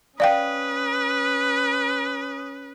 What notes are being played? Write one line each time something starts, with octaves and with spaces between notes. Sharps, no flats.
C#4 B4 D5 F5 G5 D#6